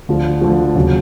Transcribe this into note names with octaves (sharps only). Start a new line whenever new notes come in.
D2 D3 F3
D2 D3 F3
D#2 C#3 F#3